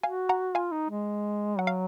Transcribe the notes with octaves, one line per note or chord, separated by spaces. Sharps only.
F#4 F5 G#5
F#5 A#5
F4 F5 G#5
D#4
G#3
F#3 F#5
F5